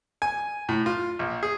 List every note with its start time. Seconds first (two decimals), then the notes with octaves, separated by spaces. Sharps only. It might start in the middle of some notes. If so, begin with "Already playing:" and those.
0.22 G#5
0.69 A2
0.86 F4
1.19 A#1
1.43 G#4